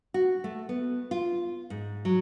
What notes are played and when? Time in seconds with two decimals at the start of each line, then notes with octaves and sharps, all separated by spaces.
0.14 F#4
0.44 A3
0.69 B3
1.11 F4
1.70 G#2
2.05 F#3